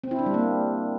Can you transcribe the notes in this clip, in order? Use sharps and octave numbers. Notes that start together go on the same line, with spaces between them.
C4
E4
D4
G3
A#3